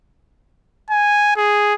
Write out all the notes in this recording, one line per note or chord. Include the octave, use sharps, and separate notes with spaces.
G#5
G#4